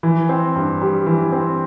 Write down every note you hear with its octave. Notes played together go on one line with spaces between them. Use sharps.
E3
C4
G2
G3
E3
C4